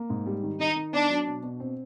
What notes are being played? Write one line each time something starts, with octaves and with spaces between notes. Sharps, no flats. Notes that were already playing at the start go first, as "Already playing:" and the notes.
Already playing: A#3
G#2
G3
D#3
D#3 D#4
D#3
B3 D4
F#3
B2
B2
C4